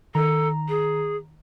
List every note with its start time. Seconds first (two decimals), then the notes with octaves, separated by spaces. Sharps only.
0.15 D#3 A4 A#5
0.69 G#4